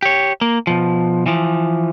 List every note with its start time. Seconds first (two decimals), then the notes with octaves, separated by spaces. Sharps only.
0.02 G4 C#5
0.41 A#3
0.67 B2 F3
1.26 E3 F3